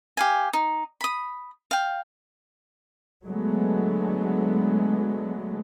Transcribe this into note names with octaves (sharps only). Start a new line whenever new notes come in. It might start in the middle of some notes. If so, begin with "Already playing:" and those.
G4 F5 G#5
D#4
B5 D#6
F5 G5
D3 F#3 G#3 A3 B3